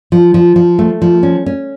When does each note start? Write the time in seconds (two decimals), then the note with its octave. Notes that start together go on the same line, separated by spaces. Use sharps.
0.12 F3
0.34 F3
0.56 F3
0.79 A3
1.02 F3
1.23 C#4
1.46 C#4